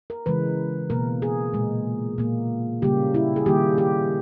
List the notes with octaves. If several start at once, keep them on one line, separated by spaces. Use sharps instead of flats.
A#4
C#3 E3 G#3 B4
B2 A#3 A#4
G#4
A#2 G#3
A#2 A#3
C#3 G3 A#3 G4
E4
G#4
D#3 G3 A#3 G4
G4